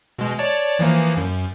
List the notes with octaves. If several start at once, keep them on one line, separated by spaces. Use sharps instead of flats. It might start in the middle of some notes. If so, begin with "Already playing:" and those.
B2 G#3
C#5 D5 A5
E3 F3 A#3
F#2